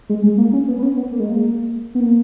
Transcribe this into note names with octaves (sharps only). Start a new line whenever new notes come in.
G#3
G#3
A#3
C#4
B3
B3
C#4
B3
A#3
G#3
A#3
B3
A#3